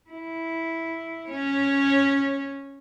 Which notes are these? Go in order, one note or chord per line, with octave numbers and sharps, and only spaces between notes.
E4
C#4 C#5